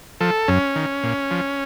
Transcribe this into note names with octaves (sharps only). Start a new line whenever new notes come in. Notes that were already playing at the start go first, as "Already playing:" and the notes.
F3 A4
F#2 C#4
D#3
A#2
F3